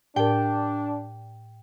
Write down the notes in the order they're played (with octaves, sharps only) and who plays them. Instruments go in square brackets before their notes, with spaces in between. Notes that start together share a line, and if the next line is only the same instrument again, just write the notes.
[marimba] A2 A#4 [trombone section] D4 [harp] G5